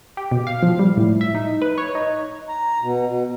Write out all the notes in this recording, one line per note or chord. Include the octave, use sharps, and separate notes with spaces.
G4
B2
F5
F3
G3
A2
E5
D#4
B4
C#5
D#4
A#5
B2
B2